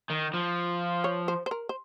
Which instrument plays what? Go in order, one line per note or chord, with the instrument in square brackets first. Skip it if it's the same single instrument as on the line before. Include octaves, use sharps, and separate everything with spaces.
[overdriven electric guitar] D#3
F3
[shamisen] C#5
C5
C5
A#4
C5